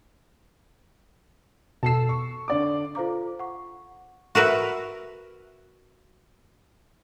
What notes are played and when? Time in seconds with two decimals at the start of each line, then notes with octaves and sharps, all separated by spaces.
1.83 B2 A4 A5 E6 C7
2.09 C#6
2.48 D3 D5 D6
2.95 F4 A4 C5 F5 A#5 D6
3.39 F#5 C#6
4.35 F#4 A#4 B4 E5